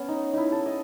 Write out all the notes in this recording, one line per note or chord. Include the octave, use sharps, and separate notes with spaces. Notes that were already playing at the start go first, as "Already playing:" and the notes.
Already playing: B3 C#4
D#4
D#4 E4
A4
D#5